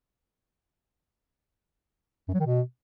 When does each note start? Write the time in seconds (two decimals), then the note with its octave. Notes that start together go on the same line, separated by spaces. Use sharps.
2.28 F#2
2.34 F#3
2.40 D#3
2.46 B2